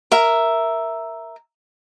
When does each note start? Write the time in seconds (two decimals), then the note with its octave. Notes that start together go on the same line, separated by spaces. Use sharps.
0.12 A#4 E5